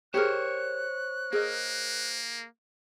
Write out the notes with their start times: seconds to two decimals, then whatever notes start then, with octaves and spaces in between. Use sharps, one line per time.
0.14 G4 G#4 A#4 C5 C#5 F#6
1.33 A#3 G#4 A#4 D#5